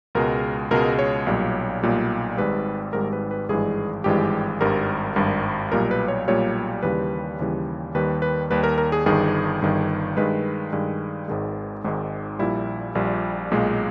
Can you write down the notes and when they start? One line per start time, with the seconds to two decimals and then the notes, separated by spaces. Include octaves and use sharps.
0.15 C#2 B2 G#3 A#4
0.71 C#2 B2 G#3 A#4
0.99 C#5
1.27 B1 A#2 G3
1.83 B1 A#2 G3
2.37 G#1 G#2 G3 B4
2.93 G#1 G#2 G3 A#4
3.13 B4
3.31 B4
3.49 G#1 G2 E3 G#3 G#4
4.04 G#1 G2 E3 G#3 G4
4.61 G#1 G2 G3 A#4
5.16 G#1 G2 G3
5.72 B1 A#2 G3 A#4
5.91 B4
6.08 C#5
6.28 B1 A#2 G3 C#5
6.83 D#2 C#3 E3 G3 B4
7.39 D#2 C#3 E3 G3
7.94 D#2 D#3 G3 B4
8.22 B4
8.50 D#2 D#3 G3 B4
8.63 A#4
8.78 A#4
8.92 G#4
9.06 G1 G2 D#3 G#4
9.62 G1 G2 D#3
10.17 G2 D#3 G#3 B4
10.73 G2 D#3 G#3
11.28 G#1 G#2 D#3 G#3
11.84 G#1 G#2 D#3 G#3
12.39 A#1 A#2 G3 E4
12.95 A#1 A#2 G3
13.51 B1 A#2 G#3